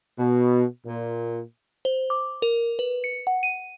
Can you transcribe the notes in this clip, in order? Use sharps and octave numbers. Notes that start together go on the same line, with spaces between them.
B2
A#2
C5
D6
A#4
B4
C#7
F#5
D#7